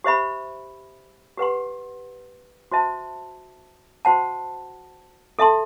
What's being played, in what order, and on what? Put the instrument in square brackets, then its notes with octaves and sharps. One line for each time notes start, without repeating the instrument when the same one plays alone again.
[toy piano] G4 C5 E5 B5
G4 B4 F#5 C6
F#4 C5 E5 A5
F#4 C5 F#5 A5
A4 E5 A5 C6